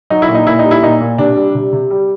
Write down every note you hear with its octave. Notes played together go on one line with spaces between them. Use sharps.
F#3 D#4
E4
A#2
D#4
A#2 E4
G3 D#4
E4
A#2 D#4
A#2
C3 D4
G3
C3
C3
G3